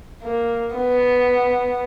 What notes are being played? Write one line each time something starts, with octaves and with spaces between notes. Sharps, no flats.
A#3
B3